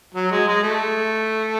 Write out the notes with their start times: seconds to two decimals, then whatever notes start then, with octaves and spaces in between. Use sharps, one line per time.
0.14 F#3
0.31 G#3
0.47 G#3
0.63 A3